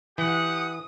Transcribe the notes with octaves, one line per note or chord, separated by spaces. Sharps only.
E3 G4 F#5 D#6